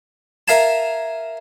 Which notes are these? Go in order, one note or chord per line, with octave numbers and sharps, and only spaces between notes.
A#4 E5 F5 G#5 A5